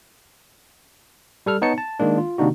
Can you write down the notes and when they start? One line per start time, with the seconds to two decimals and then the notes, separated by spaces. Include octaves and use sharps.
1.46 G3 A4 F6
1.62 B3 D#4 C#5 A5 C#7
1.78 A5
2.00 D#3 G#3 A#3 D4
2.18 F4
2.38 C3 D#3 A#3 D4 D#4 F#4